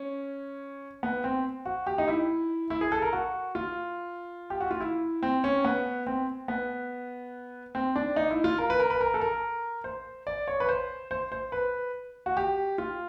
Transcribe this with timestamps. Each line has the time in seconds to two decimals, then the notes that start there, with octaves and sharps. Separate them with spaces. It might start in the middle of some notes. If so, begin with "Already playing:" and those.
Already playing: C#4
1.03 B3
1.24 C4
1.65 F#4
1.87 G4
1.98 D#4
2.08 E4
2.70 E4
2.81 G#4
2.92 A4
3.02 A#4
3.13 F#4
3.55 F4
4.50 G4
4.60 F#4
4.71 F4
4.80 E4
5.23 C4
5.44 C#4
5.65 B3
6.07 C4
6.48 B3
7.75 C4
7.96 D4
8.16 D#4
8.31 E4
8.44 F4
8.58 A#4
8.70 B4
8.80 A#4
8.90 B4
9.01 A#4
9.14 A4
9.21 A#4
9.84 C5
10.27 D5
10.48 C#5
10.60 B4
10.69 C5
11.11 C5
11.32 C5
11.52 B4
12.26 F#4
12.37 G4
12.78 F4